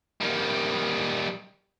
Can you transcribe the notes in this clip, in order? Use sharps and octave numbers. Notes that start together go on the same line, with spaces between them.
D#3 G3